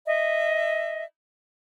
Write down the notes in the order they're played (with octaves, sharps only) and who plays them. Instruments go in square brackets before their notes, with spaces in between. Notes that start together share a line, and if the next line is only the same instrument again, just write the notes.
[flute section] D#5 E5